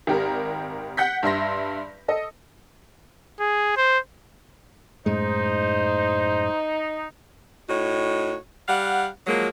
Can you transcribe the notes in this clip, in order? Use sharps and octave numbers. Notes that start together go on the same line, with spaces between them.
G#1 G4 A#4
F#5 G6 B6
G2 E5 C6 A#6
A4 D#5
G#4
C5
F#2 A2 G#3 D#4 C5
A2 D#4 F#4 C#5
G3 F5 F#5
F3 F#3 G#3 A#3